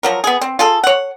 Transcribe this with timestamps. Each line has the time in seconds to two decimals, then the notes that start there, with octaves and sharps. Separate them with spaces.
0.03 F3 F#3 A#4
0.24 B3 G#4
0.41 C4
0.59 F4 G#4 A4
0.84 C#5 F#5